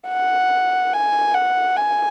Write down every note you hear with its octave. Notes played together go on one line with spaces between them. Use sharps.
F#5
G#5
F#5
G#5